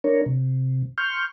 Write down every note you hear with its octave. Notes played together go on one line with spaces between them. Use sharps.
D4 A#4 C#5
C3
C6 C#6 F6 G6